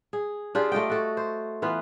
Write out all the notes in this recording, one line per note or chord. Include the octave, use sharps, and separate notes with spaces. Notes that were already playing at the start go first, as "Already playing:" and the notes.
G#4
D4 F4 G4 G#4
A3 F4 D#5 G5
F#4 A4
C5
E3 B3 F4